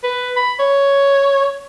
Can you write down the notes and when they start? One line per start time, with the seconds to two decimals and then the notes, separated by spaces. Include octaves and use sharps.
0.03 B4
0.36 B5
0.59 C#5